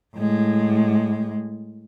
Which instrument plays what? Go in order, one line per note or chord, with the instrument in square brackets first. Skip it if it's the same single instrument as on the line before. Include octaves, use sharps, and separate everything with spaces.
[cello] A2 G#3